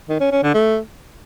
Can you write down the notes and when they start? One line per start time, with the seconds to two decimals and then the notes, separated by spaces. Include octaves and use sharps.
0.09 D#3
0.20 C#4
0.32 C#4
0.43 D3
0.54 A3